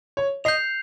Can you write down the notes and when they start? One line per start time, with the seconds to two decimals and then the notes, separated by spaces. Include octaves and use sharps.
0.17 C#5
0.44 D#5 G6 C7 F7